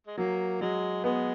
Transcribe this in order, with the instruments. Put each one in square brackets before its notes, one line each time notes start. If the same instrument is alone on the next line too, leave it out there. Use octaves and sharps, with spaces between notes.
[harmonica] G#3
[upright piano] F#3 [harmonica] A#3
[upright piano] F#3 [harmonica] G#3
[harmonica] G#3 [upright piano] B3